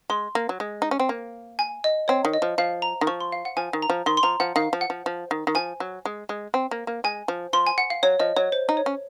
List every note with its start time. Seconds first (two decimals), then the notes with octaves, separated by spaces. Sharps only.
0.10 G#3 C6
0.35 A#3
0.49 F#3
0.60 G#3
0.82 D#4
0.91 C#4
0.99 C4
1.09 A#3
1.59 G#5
1.84 D#5
2.08 C4 C#5
2.25 D#3
2.34 D#5
2.42 F3
2.58 F3 F5
2.82 A#5
3.01 D#3
3.07 F3 C#6
3.21 C6
3.32 F5
3.45 F#5
3.57 F3 G#5
3.73 D#3
3.82 A#5
3.90 F3
4.06 D#3 C6
4.17 C6
4.23 F3 A#5
4.40 F3 F#5
4.56 D#3 F5
4.73 F3
4.81 F#5
4.90 F3
5.06 F3
5.31 D#3
5.47 D#3
5.55 F3 G#5
5.80 F#3
6.05 G#3
6.29 G#3
6.54 C4
6.71 A#3
6.87 A#3
7.04 G#3 G#5
7.28 F3
7.53 F3 C6
7.67 G#5
7.78 F#5
7.90 F5
8.03 F#3 C#5
8.19 F3 D#5
8.36 F#3 C#5
8.52 C5
8.69 D#4
8.77 C#5
8.86 C#4